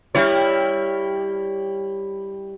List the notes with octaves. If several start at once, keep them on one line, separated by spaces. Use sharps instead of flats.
G3 E4 C#5